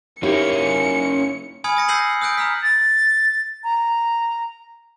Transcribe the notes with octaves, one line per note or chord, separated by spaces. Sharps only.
A#3 C#4 D#4 E4 G4 C#7
G#5 B5 D#6 F6 G#6 C#7
D#6 A#6 C#7
E6 G6 A#6 C7 D#7 F#7
D#6 E6 F#6 G6 D7
A#5 E6 F6 B6
A6
A#5